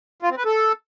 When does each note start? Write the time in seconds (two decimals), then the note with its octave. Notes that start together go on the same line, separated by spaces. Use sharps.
0.22 F4
0.30 C4
0.38 B4
0.45 A4